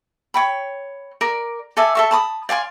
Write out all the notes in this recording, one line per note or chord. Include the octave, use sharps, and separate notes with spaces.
C#5 G5 B5
A#4 D5
A4 D5 E5 G#5
A4 E5 C#6
A5 B5 D#6
D5 F5 G#5 C6